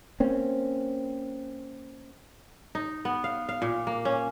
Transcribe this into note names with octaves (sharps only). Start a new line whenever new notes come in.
A#3 C4 C#4
D#4
B3
F5
F5
A#2
A#3
C#4